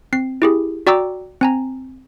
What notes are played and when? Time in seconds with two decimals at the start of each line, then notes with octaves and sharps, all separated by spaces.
0.13 C4 C7
0.42 E4 G4 G#4
0.87 F#4 D5 G5 A#5 D6 E6
1.41 C4 G#5 A#5